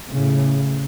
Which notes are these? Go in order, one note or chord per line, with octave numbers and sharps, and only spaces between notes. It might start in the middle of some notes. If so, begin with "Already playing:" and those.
A2 C#3